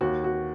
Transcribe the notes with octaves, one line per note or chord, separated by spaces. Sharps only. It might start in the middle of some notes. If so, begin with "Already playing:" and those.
D#2 F#4
F#4